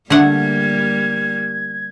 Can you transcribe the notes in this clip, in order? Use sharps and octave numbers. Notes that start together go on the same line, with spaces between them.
D3 G3 A3 A#3 F#5 G#6